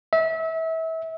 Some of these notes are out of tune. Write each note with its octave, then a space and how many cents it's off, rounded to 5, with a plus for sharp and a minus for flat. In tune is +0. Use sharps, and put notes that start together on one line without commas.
E5 -30